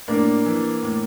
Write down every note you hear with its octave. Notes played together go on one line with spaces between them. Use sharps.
A2 A#3 D4
E3
A2